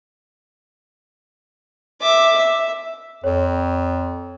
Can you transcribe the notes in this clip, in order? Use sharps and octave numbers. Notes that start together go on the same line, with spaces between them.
E5 D6
E5
F2 C#5